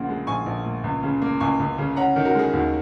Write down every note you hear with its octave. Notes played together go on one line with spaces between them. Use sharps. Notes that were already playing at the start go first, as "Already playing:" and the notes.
Already playing: A#1 A#2 C#3 F#5
G#3
A#1 G#5 C#6
A#1
A#2
C#2
C#3
A#3
C#2 G#5 C#6
C#2
C#3
C#4 F#5 A#5
D#3
F#4 A#4
G#3 G#4
D#2 F#4